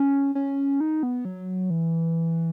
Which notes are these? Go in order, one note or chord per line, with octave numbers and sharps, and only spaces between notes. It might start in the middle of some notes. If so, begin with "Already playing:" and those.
Already playing: C#4
C#4
D#4
B3
F#3
E3